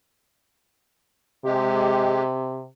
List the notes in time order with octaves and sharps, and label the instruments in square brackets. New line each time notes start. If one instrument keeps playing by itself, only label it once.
[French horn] C3 [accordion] G#3 G4